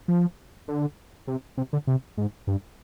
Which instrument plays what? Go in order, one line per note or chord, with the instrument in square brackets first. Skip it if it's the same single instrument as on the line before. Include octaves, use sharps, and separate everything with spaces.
[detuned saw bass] F3
D3
C3
C3
D3
C3
G#2
G2